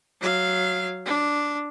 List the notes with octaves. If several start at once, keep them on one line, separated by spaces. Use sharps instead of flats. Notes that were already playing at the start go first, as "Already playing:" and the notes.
F#3 F5
D4